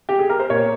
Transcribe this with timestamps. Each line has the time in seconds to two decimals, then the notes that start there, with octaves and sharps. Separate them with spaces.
0.09 G4
0.19 G#4
0.29 A#4
0.40 C5
0.50 A#2 C#5